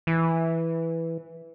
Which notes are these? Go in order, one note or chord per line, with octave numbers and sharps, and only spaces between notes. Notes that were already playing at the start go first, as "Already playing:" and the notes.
E3